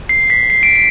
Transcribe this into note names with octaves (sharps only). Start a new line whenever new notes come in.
C7
B6
C7
D7
C7